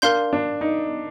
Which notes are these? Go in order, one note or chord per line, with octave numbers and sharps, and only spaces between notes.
D4 A#4 F5 C6 G6
D4
D#4